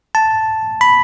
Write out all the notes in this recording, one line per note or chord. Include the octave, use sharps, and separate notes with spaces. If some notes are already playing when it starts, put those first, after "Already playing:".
A5
B5